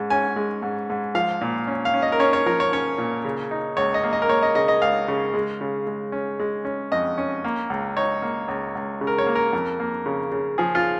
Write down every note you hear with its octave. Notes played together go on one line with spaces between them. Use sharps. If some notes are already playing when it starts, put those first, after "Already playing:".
Already playing: G#2 G#3 C#4
C#4 G#5
G#3
G#2
G#2
F3 F5
A#2
C#4
F5
C#4
D#5
A#4
C#4 C#5
C#5
F3 A#4
C#5
C#4 C#5
A#2
C#3
D#4
C#2 C#5
D#5
A#3
D#5
A#4
A#3 C#5
D#5
C#3 D#5
D#5
C#2 F5
C#3
G#3
C#3
G#3
C#4
G#3
C#4
F2 D#5
C#4
A#3
C#2
D#4 C#5
A#3
C#2
C#2
C#3
A#4
C#5
A#3
A#4
F2
A#3
C#3
C#3
F3 G#4
F4